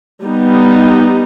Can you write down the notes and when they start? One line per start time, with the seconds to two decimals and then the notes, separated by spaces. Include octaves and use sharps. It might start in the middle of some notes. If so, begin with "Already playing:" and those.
0.25 G3 B3 D#4